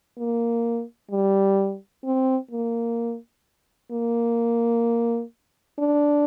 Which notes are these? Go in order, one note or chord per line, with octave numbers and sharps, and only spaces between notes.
A#3
G3
C4
A#3
A#3
D4